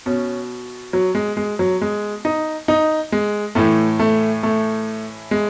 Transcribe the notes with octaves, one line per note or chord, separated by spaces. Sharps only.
B2 C#4
F#3
G#3
G#3
F#3
G#3
D#4
D#4
G#3
A2 E3 A3
A3
A3
G#3